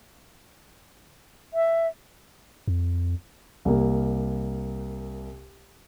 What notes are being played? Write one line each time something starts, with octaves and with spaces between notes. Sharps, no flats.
E5
F2
C2 A#3